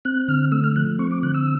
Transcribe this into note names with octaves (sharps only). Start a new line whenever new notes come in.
C4 F#6
D3 F6
A3 E6
F6
F3 F#6
C4 C#6
D6
D3 F#6
E6